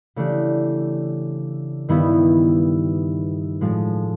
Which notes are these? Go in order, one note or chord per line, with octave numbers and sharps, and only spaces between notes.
C#3 E3 A3 D4 G4
G2 D#3 G3 B3 E4
A2 F3 G#3